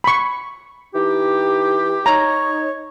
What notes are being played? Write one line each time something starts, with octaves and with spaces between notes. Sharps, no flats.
B5 C#6
E3 D#4 G4
D#4 C#5 A#5